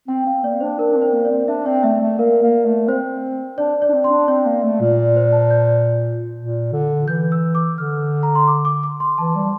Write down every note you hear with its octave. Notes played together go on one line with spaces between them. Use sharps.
C4 G5
C4 F5
A#3 D5
D4 C5
D4 A#4
D4
C4
C5
A#3
D5
C4
D4 E5
C4 D5
A3 E5
A3
A#3 A#4
A#3
A3
C4 C5
D4 D5
D5
D4
C4
C6
D4
C4 D5
A#3
A3
A#2
C5
A5
G6
A#2
D3
E3 G6
E6
D6
D3 F6
A#5
C6
D6
D6
D6
C6
E3 A5
G3